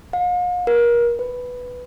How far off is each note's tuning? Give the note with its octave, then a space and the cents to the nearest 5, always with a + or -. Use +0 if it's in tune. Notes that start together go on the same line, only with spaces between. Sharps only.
F5 +45
A#4 +30
B4 +0